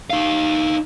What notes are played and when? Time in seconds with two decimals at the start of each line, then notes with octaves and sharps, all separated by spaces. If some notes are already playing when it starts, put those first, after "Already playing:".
0.10 D#4 F5